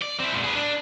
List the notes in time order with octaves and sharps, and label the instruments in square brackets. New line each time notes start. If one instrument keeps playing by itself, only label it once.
[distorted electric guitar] D5
C4 E4
A#2 G#3
G#4 B4
D4